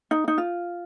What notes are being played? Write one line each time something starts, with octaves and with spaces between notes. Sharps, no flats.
D#4
D#4
F4